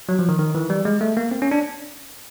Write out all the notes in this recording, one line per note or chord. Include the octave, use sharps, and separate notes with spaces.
F#3
F3
D#3
D#3
E3
G3
G#3
A3
A#3
C4
C#4
D4